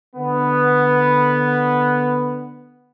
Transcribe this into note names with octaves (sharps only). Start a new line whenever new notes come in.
D3 B3